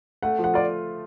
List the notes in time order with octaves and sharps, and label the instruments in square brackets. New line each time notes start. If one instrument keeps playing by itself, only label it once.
[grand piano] A3 [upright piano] F#5
[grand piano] F3
[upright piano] F#5
[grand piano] F4 [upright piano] D5